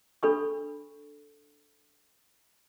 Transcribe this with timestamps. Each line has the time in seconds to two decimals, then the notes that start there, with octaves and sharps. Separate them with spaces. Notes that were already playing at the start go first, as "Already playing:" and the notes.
0.23 D4 A4 B5 C#6